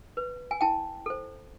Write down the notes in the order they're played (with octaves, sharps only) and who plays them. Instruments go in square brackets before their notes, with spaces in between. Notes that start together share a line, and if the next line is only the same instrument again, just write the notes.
[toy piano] B4
G#5
E4 G5 A5
A4 C5